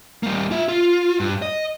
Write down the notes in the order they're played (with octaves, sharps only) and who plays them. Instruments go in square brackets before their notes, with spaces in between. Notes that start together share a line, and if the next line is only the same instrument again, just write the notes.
[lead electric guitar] G3 A#3
F4 E5
F4
G2
D#5